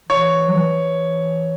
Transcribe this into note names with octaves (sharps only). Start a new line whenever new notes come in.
E3 C#5
F#3
E3